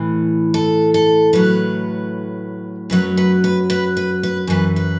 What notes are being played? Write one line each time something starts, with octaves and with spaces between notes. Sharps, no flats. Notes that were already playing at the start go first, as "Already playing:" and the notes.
Already playing: A2 E3
A4
A4
A2 F#3 B4
F#2 F#3 B4
B4
B4
B4
B4
B4
F#2 E3 B4
B4